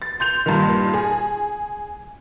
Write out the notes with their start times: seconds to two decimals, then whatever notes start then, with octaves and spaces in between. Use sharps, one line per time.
0.02 A6
0.20 C6 G6 F7
0.46 G2 A#2 D#3
0.93 G#4